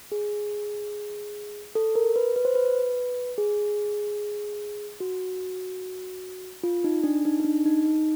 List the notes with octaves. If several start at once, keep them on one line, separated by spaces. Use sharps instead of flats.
G#4
A4
A#4
B4
B4
C5
B4
G#4
F#4
F4
D#4
D4
D#4
D#4
D4
D#4
D#4